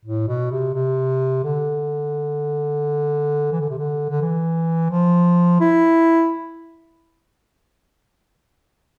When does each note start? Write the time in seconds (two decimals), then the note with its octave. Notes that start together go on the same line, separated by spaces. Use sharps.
0.05 A2
0.28 B2
0.51 C3
0.74 C3
1.44 D3
3.52 E3
3.61 D3
3.69 C3
3.78 D3
4.09 D3
4.21 E3
4.91 F3
5.60 E4